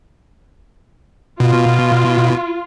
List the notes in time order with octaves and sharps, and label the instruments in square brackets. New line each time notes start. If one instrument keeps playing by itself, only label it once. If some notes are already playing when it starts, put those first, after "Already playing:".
[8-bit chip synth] B2 [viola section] F4